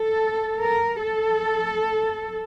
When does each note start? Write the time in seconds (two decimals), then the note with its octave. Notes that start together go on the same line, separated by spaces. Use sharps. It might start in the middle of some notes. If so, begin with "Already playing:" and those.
Already playing: A4
0.62 A#4
1.03 A4